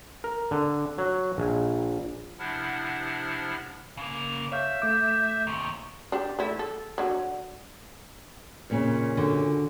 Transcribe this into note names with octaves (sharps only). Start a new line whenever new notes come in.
A#4
D3
F#3
A#1
C3 F3 D4 E4 F#5 F6
C#3 A#3
C#5 E5 F5 G6
A3 D6 G6
D#2 C3 C#6
D4 G4
A3 E4
A4
D3 F#3
F2 A#2 C#3
D3 F#4